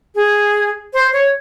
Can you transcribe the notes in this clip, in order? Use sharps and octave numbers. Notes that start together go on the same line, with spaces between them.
G#4
C5
C#5